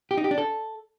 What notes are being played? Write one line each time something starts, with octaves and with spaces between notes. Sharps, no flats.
G4
D#4
G4
D4
A4